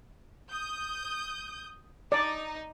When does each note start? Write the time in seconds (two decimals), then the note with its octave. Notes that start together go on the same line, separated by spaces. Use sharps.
0.49 D#6 G6
2.12 D#4 D5